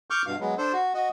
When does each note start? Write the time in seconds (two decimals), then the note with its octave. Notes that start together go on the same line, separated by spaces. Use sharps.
0.10 C#6 D6 F6 G6
0.26 G2 B2 F5
0.40 F#3 G#3 B3
0.58 D4 A4 C5
0.73 F#4
0.94 F#4 D#5